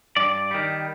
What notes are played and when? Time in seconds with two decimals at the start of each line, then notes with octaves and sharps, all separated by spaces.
0.16 G2 D5
0.51 D#3 G3